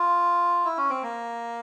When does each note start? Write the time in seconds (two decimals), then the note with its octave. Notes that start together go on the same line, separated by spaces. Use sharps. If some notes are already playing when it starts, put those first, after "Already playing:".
Already playing: F4
0.65 E4
0.77 C#4
0.90 C4
1.03 A#3